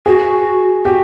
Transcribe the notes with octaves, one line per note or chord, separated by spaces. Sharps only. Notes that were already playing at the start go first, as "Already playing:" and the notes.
F#4 G#4
F#4 G4